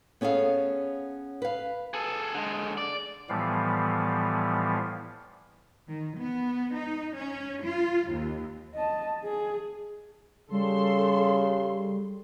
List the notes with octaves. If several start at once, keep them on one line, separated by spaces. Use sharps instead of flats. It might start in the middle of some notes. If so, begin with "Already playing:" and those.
B3 C#4 G#4 A4 F5
B4 F5
G#4 A4
D3 G#3
D5
A2 E3 F3 G3 B3 F5
D#3
B3
D#4
C#4
F4
D#2
D#5 A5
G#4
C#3 G3 A4 C6